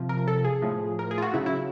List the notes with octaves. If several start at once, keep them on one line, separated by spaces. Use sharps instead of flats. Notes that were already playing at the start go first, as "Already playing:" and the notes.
Already playing: C3 F3
A#4
A4
G#4
A2 F3
A#4
G#4
F4
F#4
C#3 F#3 E4
E4